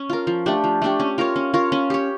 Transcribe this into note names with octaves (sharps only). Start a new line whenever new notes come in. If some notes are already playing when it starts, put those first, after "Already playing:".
Already playing: C#4
F4 A#4
F3
A3 D4 G4
F3
A3 D4 G4
C#4
F4 A#4 C#5
C#4
F4 A#4 C#5
C#4
G4 C#5